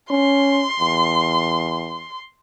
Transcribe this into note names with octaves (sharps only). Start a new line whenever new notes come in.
C#4 C6
E2